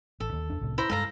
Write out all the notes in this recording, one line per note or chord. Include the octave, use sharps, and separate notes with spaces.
A1 A4
D#2
E2 D4
C2 A2 C3
E4 C5 A#5
G2 G#3 A4 F5 A#5